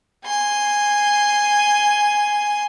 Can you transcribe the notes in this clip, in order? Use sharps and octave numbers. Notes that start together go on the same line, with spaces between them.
G#5 C6